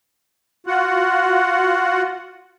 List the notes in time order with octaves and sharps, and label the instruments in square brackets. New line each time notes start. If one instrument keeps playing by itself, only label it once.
[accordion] F4 F#4 F#5